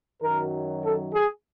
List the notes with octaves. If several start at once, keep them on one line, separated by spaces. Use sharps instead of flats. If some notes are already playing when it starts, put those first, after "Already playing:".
F#2 D#3 F#3 A#4
A4
G#4